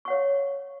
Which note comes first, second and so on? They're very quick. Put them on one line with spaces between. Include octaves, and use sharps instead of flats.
C#6 F#5 C#5 F5